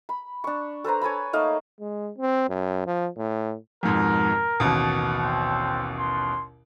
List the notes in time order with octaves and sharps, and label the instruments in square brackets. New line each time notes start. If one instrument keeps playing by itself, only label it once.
[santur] B5
D4 C#6
A4 B4 C5 A#5
C#5 G#5 A5 B5
A3 A#3 D#4 F5
[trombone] G#3
C4
F#2
F3
A2
[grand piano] F2 G#2 B2 [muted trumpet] A#4
[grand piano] A1 D#2 B2
[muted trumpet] C4
C6